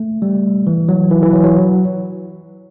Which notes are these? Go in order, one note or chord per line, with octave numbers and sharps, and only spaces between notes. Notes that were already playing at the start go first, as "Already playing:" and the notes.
Already playing: A3
G3
E3
F#3
E3
E3
F#3
F#3